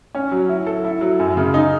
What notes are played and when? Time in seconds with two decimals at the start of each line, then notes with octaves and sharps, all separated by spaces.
0.15 C#4
0.31 F#3
0.49 E4
0.67 A4
0.84 E4
1.01 F#3
1.19 F#2
1.37 C#3
1.54 D#4